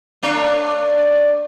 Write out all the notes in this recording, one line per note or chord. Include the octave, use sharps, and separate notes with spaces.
A3 D4 C#5